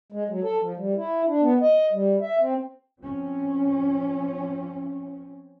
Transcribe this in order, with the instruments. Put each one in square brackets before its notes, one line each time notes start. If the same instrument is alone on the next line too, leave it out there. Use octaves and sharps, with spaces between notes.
[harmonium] G#3
F#3
A4
F3
G3
E4
D4
B3
D#5
G3
E5
C4
[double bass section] F3 C4 C#4